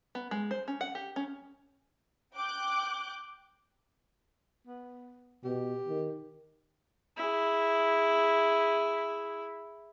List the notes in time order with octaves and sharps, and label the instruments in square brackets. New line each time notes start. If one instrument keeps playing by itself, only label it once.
[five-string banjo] B3
G#3
C5
C#4
F#5
G4
C#4
[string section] G5 D6 F#6 G6
[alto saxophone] B3
[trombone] B2 [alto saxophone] G4
[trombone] D#3
[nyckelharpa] E4 G#4